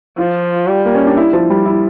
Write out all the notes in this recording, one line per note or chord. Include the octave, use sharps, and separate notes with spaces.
F3 F4
G3
A#3
C#4
D4
E4
F3
G3
E4